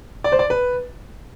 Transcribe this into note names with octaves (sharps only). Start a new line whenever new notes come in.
D5
C5
D5
B4